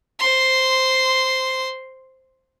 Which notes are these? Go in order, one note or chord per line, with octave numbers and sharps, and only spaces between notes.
C5 C6